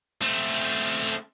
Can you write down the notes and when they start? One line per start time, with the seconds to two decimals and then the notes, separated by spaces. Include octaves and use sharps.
0.22 A3 C4